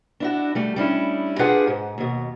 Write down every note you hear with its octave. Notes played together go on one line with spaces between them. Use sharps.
D4 E4 F#4
G3 A3
G3 C#4 D4 E4
D4 F4 G4 G#4 B4 F#5
G#2
D#2 B2